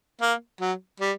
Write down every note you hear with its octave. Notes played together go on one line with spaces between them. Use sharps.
A#3
F#3
G3